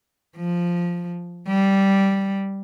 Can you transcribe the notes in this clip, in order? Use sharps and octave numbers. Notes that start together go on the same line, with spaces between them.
F3
G3